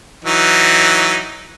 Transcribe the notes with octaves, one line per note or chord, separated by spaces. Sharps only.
E3 F#3 D#4